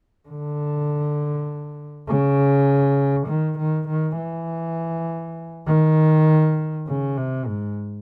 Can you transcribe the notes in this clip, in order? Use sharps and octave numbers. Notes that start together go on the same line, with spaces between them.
D3
C#3
D#3
D#3
D#3
E3
D#3
C#3
C3
G#2